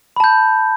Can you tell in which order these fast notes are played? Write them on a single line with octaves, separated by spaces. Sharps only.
B5 A5 G6